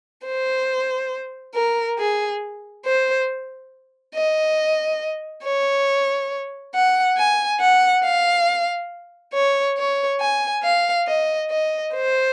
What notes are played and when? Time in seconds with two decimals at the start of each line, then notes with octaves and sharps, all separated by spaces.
0.25 C5
1.54 A#4
1.98 G#4
2.85 C5
4.14 D#5
5.44 C#5
6.74 F#5
7.17 G#5
7.60 F#5
8.04 F5
9.34 C#5
9.77 C#5
10.20 G#5
10.63 F5
11.07 D#5
11.50 D#5
11.94 C5